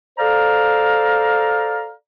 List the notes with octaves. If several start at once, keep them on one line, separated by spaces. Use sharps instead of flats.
A4 C5 D5 F5 A#5